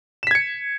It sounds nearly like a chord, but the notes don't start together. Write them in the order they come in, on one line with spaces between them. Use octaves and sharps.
E7 B6 G#6 C#7